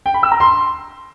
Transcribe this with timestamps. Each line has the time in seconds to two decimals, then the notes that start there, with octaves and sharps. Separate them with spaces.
0.06 G5
0.14 B5
0.23 E6
0.32 A#5
0.40 C6